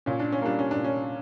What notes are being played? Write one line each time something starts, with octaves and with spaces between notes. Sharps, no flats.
A#2 C#4
D4
C#4
G3 A#3 D4
C#4
D4
A#2
C#4